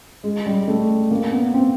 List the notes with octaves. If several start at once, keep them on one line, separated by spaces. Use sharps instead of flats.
G#3
G3
A3
A#3
B3
C4